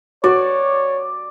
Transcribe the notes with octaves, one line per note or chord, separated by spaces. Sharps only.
F#4 C#5 D5